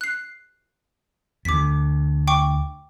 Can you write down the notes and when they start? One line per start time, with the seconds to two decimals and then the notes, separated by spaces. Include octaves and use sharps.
0.01 F#6 C7
1.45 D2 D6 B6
2.27 G5 C#6 D6